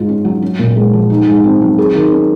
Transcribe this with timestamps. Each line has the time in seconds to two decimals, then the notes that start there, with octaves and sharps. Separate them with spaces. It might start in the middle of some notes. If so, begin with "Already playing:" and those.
Already playing: G#2 F4
0.09 C#4
0.25 F#3
0.42 C#4
0.59 A#2
0.76 G#3
0.93 F3
1.10 D#4
1.27 G#2
1.44 C4
1.61 F#3
1.78 G#4
1.95 D#3
2.12 C#4